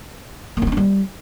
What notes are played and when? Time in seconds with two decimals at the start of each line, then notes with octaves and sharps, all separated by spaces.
0.57 A#3
0.62 C#4
0.67 D#4
0.72 D4
0.77 G3